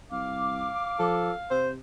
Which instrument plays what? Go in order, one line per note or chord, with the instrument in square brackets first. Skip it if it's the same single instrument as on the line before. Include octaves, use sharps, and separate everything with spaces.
[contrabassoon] C2 [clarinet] F5 [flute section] D6
[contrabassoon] F3 [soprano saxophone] A4
[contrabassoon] C3 [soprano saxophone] C5